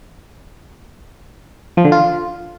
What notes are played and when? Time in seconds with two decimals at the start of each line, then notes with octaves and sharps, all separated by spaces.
1.77 F3
1.85 D3
1.92 F4